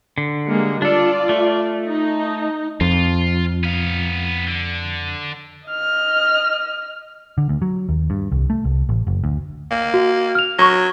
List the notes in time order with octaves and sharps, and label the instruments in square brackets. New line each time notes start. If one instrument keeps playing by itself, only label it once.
[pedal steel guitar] D3
[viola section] G3 G#3 A#3
[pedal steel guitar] D4 A4 [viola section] F4 D5
[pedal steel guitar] A3
[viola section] D#4
[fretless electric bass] F2 [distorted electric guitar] F4
[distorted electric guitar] B3 F5
D3
[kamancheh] D#5 F6
[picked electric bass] D3
D2
F#3
D#2
G2
C2
A3
C2
A1
F#1
D2
[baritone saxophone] A#3
[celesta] F#4
F6 F7
[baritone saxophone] F#3 [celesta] C#6 A#6